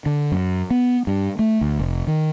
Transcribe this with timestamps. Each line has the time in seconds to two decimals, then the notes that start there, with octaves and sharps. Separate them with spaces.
0.06 D3
0.32 F#2
0.70 B3
1.07 G2
1.39 A3
1.61 D2
1.79 F1
2.07 D#3